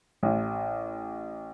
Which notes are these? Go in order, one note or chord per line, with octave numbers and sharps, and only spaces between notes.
A1